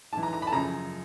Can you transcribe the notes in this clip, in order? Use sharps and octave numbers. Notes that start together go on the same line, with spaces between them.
G#2 E3 A5
A#5
A#5
B5
A5
F#2 C#3 F3 A#5